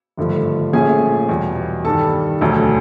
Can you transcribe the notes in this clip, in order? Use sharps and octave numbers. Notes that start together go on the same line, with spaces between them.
G#1 G2 D3 F3 A3
A#1 A#2 F3 A3 C#4 G#4 G#5
E2 B2 G3
G2 D#3 G3 A4 A5
E1 D2 D3 F#3